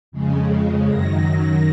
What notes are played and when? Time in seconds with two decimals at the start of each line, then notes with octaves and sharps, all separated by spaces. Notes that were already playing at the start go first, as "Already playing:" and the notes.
0.12 F2 C#3 G#3
0.87 F#2 D#3 F#3 A#6